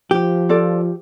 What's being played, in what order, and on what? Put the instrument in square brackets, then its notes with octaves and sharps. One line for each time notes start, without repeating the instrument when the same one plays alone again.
[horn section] F3 [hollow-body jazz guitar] G4
[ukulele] F4 A4 D5